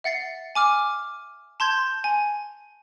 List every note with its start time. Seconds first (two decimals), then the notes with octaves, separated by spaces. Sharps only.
0.04 E5 F#5 A6 C7
0.55 G#5 D6 F6
1.60 A5 C6 G6 G#6
2.04 G#5